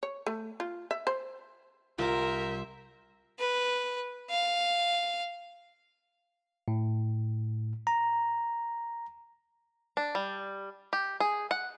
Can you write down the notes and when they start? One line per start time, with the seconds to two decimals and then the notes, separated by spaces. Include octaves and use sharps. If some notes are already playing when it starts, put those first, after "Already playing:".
0.03 C#5
0.26 A3
0.60 F4
0.91 E5
1.07 C5
1.98 C2 F4 A#4 C5 E5 D6
3.39 B4
4.30 F5
6.68 A2
7.87 A#5
9.97 D4
10.15 G3
10.93 G4
11.20 G#4
11.51 F#5